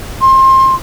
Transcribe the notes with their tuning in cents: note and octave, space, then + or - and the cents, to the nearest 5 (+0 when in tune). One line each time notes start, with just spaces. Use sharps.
C6 +25